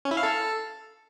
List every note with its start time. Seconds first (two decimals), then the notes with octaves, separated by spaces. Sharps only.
0.05 C#4
0.11 E4
0.17 F5
0.23 A4